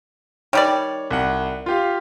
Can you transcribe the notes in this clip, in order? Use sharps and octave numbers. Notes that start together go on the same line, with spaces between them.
D#3 G3 C#5 D5
C2 F#5
F4 G4 F5